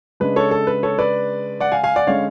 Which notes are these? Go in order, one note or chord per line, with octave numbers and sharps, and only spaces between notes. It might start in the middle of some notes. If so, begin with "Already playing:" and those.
C#3 G#3 D4 B4
A4 C#5
A4
B4
A4 C#5
B4 D5
D5 F#5
F5 G#5
F5 G#5
D5 F#5
D3 G#3 C#4 C#5 F5